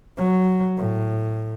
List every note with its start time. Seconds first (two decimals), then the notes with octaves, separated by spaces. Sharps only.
0.17 F#3
0.78 A2